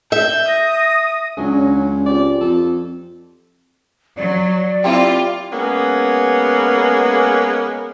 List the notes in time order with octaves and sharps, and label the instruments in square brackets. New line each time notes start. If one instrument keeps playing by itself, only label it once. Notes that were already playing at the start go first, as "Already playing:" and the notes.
[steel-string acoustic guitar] E5 [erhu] G6
[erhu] D#6 [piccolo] A#6
[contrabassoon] C#2 [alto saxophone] F#3 [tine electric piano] C#4 G#4 [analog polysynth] D4
[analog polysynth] C4 F4 G4 [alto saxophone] D5
[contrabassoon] F2 [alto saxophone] A4
[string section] F#3 [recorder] D5
[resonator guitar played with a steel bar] A#3 C4 E4 [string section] F4 [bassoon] G4
[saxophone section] G#3 A#3 B3 C#4